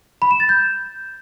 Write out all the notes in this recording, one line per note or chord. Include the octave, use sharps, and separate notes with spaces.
B5
E7
A6
G6